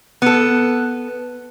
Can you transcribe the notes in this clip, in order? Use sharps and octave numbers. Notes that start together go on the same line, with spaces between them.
B3 A4